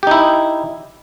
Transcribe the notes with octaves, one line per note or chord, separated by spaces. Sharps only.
D#4 E4 G4